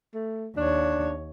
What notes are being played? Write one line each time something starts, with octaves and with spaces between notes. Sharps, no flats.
A3
D#2 D4 C#5